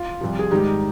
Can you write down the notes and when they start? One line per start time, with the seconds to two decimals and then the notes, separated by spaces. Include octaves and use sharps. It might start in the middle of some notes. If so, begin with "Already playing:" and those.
Already playing: F4
0.21 C2 C3 F3
0.39 G#4
0.51 G#2 D#3 G3 D#4 G4